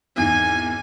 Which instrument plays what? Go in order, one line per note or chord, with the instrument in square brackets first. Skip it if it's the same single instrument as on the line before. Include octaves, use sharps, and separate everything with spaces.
[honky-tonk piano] G#1 E2 D#3 [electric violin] G#5